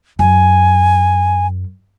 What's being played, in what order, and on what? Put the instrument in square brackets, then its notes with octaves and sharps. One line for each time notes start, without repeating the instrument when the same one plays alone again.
[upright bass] F#2 [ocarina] G#5